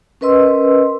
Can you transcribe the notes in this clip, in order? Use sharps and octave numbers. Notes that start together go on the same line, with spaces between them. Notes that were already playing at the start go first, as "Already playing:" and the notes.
C#4 A#4 B4 D#5 C6 E6